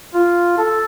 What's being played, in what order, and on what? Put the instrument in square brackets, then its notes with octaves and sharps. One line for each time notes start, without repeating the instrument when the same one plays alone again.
[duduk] F4
A4